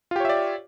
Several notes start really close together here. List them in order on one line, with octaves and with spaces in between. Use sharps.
F4 G4 C#5 E5 D5